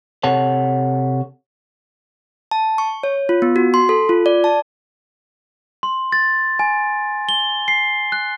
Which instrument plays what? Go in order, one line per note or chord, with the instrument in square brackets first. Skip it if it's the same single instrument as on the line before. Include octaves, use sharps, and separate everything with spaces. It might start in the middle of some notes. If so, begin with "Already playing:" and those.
[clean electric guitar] C3 A4 C#5 F#5 A5
[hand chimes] A5
C#6
C#5
F4
B3
F#4
C6
A4
F4
D5
A5
[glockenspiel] C6
A6
G#5
G7
C7
F#6